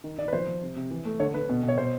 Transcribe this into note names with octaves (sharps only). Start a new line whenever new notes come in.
D#3
D#3 D5
B4
F3 C5
F3
C3
C3
E3
A3
D3 C#5
D3 B4
B2
B2
C#5
B2 C5